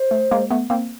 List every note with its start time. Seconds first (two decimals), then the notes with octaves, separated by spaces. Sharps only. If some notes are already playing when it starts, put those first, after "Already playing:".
Already playing: C5
0.11 A3
0.31 G#3 A#3
0.51 A3 B3
0.70 A#3 C4